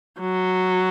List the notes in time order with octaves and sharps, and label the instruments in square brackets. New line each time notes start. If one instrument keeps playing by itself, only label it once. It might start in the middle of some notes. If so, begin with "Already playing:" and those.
[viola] F#3